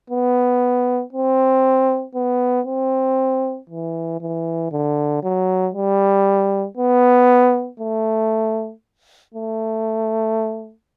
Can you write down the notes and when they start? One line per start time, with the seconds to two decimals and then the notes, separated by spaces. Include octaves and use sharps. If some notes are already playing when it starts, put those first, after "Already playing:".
0.10 B3
1.13 C4
2.15 B3
2.67 C4
3.70 E3
4.21 E3
4.72 D3
5.23 F#3
5.74 G3
6.77 B3
7.80 A3
9.34 A3